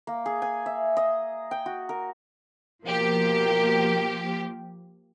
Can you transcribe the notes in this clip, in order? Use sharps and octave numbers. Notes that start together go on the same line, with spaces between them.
A#3
G#4
G#5
E5
D#5
G5
F#4
A#4
B2 F3 A#3 G4 A#4